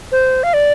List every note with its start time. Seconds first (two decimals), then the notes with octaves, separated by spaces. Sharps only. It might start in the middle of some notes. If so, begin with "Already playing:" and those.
0.12 C5
0.43 F5
0.54 D5